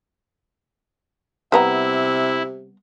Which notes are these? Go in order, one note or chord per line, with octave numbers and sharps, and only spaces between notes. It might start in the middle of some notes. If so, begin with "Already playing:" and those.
C3 G3 B3 E4 A#5